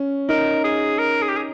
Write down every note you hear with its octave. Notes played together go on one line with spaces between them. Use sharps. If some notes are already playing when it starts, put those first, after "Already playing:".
Already playing: C#4
D#4 A#4
G#4
A#4
G#4
G4
G#4